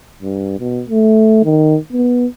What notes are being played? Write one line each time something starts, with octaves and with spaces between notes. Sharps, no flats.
G2
B2
A3
D#3
B3